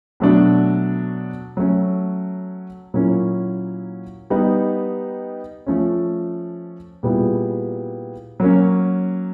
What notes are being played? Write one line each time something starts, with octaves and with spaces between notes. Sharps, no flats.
B2 F#3 A3 D4 F#4
F#3 A3 C#4
A#2 F#3 A#3 C#4 E4
G3 B3 D#4
F3 A3 C#4
A#2 G3 B3 E4 G#4
F#3 A#3 C#4